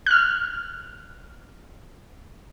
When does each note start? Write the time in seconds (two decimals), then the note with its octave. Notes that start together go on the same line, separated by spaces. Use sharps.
0.06 F6 F#6